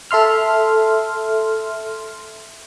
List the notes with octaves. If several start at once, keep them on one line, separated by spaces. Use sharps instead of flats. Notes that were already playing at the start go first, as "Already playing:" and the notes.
A4 E5 C6 F6